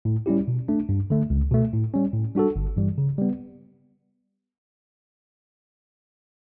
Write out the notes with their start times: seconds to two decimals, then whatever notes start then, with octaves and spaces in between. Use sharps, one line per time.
0.05 A2
0.26 G3 C#4 E4 G4
0.48 B2
0.68 A3 D4
0.89 G2
1.10 D3 A3
1.30 C#2
1.51 B2 A3
1.73 A2
1.94 G3 C#4
2.13 A2
2.35 G3 D4 F#4 A4
2.56 G1
2.77 G2 E3 G3
2.98 C#3
3.18 G3 B3